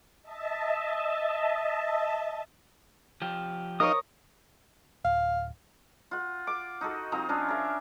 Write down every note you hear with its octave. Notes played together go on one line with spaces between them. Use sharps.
D#5 E5 A5
F3 G4
D#4 A#4 C#5 D#5 F5 D#6
D1 F5
F4 F#5
D6
D#4 F#4 A4
F3 C4 D#4 A#5
C#4 D4 F4
A#4 E5